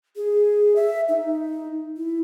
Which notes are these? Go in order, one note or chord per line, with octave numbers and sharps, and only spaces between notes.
G#4
E5
D#4
E4